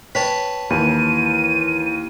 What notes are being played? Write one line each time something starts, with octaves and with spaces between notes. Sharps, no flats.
B4 C#5 G5 A5
D#2 E3 D#7